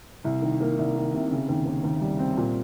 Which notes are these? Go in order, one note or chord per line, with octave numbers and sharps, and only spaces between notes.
C2
D#3
A#3
C2
D#3
C3
C#3
D#2
D#2
D#2
G3
C4
A#2